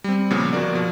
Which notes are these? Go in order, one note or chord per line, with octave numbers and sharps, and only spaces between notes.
G3 C4
A#2 C#3 F3 A#3 B3
G1 F3 F#4 A#4 D5
B2 F3